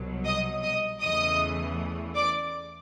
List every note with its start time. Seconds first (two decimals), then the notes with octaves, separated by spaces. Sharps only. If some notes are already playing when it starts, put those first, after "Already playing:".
Already playing: C2 B2 F#3
0.25 D#5 D#6
0.63 D#5 D#6
1.01 E2 C#3 E3 A3 D#5 D#6
2.15 D5 D6